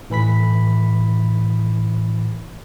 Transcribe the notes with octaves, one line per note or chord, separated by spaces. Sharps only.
A2 E3 B5 B6